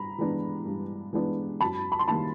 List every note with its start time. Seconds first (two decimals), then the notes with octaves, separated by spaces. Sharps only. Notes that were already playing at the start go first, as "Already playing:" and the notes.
Already playing: G2 A#5 B5
0.18 E3 G#3 B3 D4
0.66 G2
1.13 E3 G#3 B3 D4
1.60 F#2 A5 B5
1.92 B5
1.99 C6
2.08 D#3 G3 A#3 A5 B5